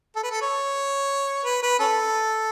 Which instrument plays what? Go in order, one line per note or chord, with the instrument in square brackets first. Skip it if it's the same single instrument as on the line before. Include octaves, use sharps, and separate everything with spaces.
[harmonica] A4
B4
A4
C#5
B4
B4
C#4 A4